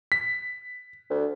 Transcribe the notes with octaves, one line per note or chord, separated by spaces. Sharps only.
B6
D2